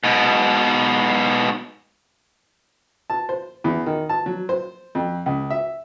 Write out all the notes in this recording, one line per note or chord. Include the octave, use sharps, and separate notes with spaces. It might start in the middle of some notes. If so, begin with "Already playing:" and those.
G#2 B2
A5
C5
E2
D#3
A5
F#3
C5
F2
C#2
E5